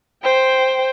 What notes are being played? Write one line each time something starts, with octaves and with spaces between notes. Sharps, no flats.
C5 G5